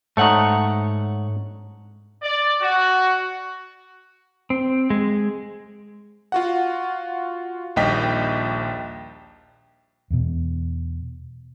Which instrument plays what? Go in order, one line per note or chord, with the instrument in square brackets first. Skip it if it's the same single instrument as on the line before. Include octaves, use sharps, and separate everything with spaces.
[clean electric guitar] G#2 C#5 F#5 [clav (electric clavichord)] A3 D#4
[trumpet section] D5
F#4
[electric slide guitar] C4
G#3
[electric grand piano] F4 F#4 F#5
A#1 D#2 G3 D#5 G5 B6
[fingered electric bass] E2 B2